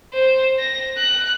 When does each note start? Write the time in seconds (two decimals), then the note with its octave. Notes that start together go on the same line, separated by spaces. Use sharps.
0.14 C5
0.59 A#6
0.98 F#6